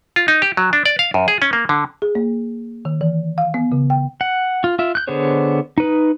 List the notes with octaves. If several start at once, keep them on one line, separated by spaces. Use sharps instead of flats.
F4
D#4
G4
F#3
D4
D5
F5
F#2
G#4
C#4
A#3
D3
G#4
A#3
D#3
E3
F5
B3
C#3
G5
F#5
F4
F4 E5
F#6 G6
D3 B3 G#4 C5 C#5
D#4 B4